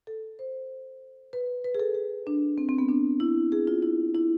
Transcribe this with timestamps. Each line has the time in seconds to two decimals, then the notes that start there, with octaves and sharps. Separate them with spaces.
0.07 A4
0.39 C5
1.33 B4
1.64 B4
1.75 G#4
1.80 A4
1.95 G#4
2.27 D4
2.58 C4
2.69 C4
2.78 B3
2.89 D4
3.20 E4
3.52 G#4
3.67 F4
3.83 E4
4.15 E4